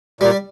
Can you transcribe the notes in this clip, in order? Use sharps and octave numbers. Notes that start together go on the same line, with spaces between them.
A#2 G3